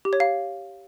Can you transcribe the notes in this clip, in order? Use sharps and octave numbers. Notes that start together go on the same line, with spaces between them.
G4
C#5
F5